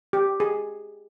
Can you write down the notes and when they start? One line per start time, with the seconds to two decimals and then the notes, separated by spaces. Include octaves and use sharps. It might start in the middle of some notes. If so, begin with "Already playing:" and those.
0.13 G4
0.40 G#4